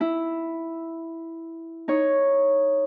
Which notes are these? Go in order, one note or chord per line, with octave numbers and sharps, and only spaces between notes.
E4
D#4 C#5